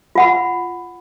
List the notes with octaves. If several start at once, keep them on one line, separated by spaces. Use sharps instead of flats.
F4 F#5 B5